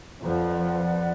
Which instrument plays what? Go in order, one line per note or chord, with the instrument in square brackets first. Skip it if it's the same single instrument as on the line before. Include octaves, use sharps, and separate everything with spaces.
[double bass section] F2 F3 [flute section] B4 D5 F#5